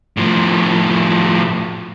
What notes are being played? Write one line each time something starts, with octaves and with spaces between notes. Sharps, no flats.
A2 F3